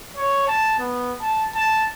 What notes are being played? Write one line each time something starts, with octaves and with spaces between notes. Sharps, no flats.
C#5
A5
B3
A5
A5